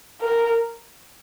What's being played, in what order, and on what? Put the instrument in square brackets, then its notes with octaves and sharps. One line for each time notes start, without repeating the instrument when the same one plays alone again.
[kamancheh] A#4